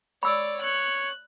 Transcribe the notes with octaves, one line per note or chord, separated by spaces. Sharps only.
C#5 D5 B5 E6
C#5 F#6